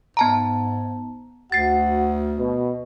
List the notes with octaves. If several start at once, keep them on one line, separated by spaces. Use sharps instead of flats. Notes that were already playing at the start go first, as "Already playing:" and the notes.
G#2 B3 A5 A#5
D2 F#4 F#5 A6 C7
B2